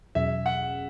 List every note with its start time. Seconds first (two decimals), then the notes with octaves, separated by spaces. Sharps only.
0.15 E2 B2 F#3 C#4 G#4 E5
0.46 F#5